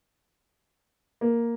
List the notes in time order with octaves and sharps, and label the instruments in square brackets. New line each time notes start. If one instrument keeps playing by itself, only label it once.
[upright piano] A#3